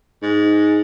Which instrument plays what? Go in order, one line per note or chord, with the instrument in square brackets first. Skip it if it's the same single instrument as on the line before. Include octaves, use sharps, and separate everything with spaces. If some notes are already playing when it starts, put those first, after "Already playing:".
[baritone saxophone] G#2